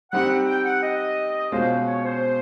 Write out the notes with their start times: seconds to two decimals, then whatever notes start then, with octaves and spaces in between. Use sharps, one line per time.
0.12 G3 C4 D#4 G4 F#5
0.47 G5
0.65 F#5
0.83 D#5
1.52 B2 G#3 C#4 F4 C5
1.87 C#5
2.04 C5